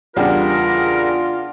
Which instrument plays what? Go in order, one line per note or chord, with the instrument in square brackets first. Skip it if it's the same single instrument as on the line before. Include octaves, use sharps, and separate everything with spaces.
[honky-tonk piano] E2 C#3 G3 [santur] D4 F#5 G5 [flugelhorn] F4 [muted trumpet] A#4